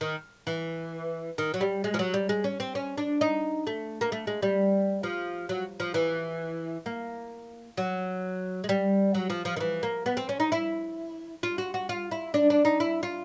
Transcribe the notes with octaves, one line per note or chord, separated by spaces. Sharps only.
D#3
E3
D#3
F#3
G3
G#3
F3
F#3
G3
G#3
C#4
C4
C#4
D4
D#4
A3
A#3
A3
G#3
G3
F3
F#3
F3
E3
A#3
F#3
G#3
G3
F#3
F3
F3
D#3
E3
A#3
B3
C4
C#4
D#4
E4
F4
F#4
F#4
F4
E4
D4
D4
D#4
E4
F4